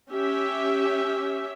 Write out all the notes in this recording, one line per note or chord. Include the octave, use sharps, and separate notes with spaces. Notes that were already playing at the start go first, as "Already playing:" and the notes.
C#4 G4 E5